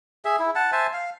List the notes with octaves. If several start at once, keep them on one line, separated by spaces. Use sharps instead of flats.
G#4 E5
E4
F#5 A5
C5 E5 G#5 A5
F5